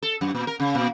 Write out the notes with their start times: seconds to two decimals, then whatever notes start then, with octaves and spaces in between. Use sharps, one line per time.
0.02 A4
0.21 F#2
0.35 A#2
0.47 A#4
0.60 C#3
0.75 A#2